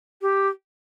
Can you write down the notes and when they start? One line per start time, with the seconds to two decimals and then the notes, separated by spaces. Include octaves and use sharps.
0.21 G4